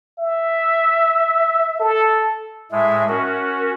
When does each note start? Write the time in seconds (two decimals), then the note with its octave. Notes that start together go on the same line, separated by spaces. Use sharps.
0.19 E5
1.80 A4
2.71 A2 G#3 E5
3.09 C#4 F#4 A#4